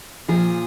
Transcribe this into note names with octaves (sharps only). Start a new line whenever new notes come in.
A#2 F3 G#4